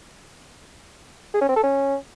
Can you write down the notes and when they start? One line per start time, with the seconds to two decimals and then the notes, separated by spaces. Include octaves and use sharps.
1.34 G#4
1.41 C#4
1.48 C4
1.56 A4
1.63 C#4